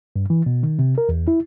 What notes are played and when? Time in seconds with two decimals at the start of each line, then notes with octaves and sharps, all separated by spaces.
0.16 G2
0.30 E3
0.46 B2
0.63 D#3
0.79 C3
0.98 A#4
1.09 E2
1.28 E4